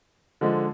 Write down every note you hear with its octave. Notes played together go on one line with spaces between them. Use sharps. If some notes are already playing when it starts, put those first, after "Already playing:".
D3 F3 G#3